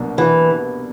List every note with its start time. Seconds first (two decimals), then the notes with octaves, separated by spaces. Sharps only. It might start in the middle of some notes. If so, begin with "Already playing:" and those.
Already playing: C2 B2 F#3 A#3 D4
0.18 E3